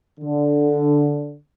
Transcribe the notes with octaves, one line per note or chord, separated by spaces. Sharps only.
D3